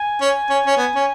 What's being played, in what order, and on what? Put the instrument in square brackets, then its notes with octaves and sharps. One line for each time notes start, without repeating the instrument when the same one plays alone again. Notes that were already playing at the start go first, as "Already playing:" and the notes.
Already playing: [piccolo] G#5
[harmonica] C#4
C#4
C#4
B3
C#4